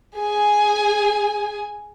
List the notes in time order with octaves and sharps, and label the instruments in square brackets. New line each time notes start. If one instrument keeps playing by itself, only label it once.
[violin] G#4 G#5